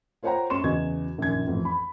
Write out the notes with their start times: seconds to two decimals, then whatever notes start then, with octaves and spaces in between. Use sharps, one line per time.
0.23 F4 C5 C#5 F#5 G5 A#5
0.50 F#2 C6 C#6 E7
0.64 E2 C#3 F#4 D#5 G#6
1.18 A#1 F#2 D#3 G#6
1.47 A1 F2
1.65 B5